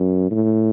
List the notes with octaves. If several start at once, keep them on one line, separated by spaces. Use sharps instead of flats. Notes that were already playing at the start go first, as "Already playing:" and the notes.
Already playing: F#2
A2